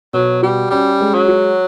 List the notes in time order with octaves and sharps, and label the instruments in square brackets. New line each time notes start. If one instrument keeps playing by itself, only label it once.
[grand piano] B2 [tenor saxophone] F#3
[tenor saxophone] G3 [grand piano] F#4
[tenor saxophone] G3 [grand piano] C#4
[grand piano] G#3
[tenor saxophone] F#3
[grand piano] F#4